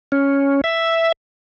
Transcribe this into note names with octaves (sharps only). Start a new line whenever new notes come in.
C#4
E5